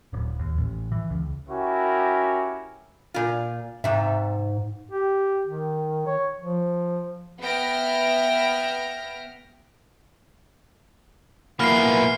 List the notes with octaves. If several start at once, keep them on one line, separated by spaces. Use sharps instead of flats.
D1
D#2
A1
E3
C#2
C#4 E4 F#4 G4 A#4
A#2 F4
G#2 C3 E5
G4
D#3
C#5
F3
B3 E5 G5 F6 A#6 D7
A#2 E3 A#3 B3 F6 C7